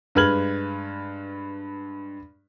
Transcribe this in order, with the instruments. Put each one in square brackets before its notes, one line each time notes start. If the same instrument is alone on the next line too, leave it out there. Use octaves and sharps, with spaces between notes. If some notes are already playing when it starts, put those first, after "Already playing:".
[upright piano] G2 G#3 B4 F6 G#6 F#7